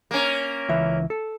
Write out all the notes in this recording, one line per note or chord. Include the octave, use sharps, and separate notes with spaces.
A#3 C#4
C#2 E3 E5
A4